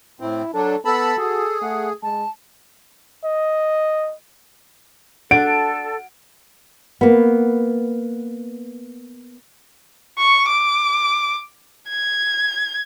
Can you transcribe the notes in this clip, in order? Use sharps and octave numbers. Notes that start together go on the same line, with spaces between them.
A2 C4 E4
F#3 D4 A4
B3 A4 A5 B5 E6
F#4 G#4
A3 F#5
G#3 A5
D#5
D4 A4 F#5 D7
A#3 B3
C#6
D6
G#6